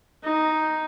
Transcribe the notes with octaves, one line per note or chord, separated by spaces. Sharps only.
D#4